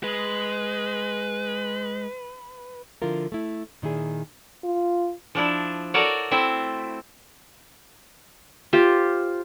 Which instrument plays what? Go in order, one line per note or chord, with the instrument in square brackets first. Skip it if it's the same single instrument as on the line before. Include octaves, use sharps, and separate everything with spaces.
[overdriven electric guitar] G#3 [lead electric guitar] B4
[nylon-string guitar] D3 F3 E4 F4 A#4
A3 E4
A#2 D#3 E4 G#4
[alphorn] F4
[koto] F3 D4 E4
F#4 A4 A#4 C#5 D5
A3 C4 E4 C5 E5
[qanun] F4 G4 C5